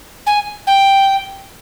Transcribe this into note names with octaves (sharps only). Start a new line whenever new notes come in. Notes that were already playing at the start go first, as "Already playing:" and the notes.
G#5
G5